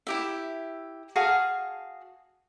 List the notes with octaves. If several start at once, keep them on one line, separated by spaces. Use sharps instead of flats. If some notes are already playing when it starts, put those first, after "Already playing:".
E4 G4 E5
F#4 G#4 F5 A5